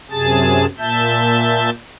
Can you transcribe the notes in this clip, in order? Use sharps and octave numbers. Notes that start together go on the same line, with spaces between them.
F#2 C3 G#4 A5 A6
A#2 E5 A5 G6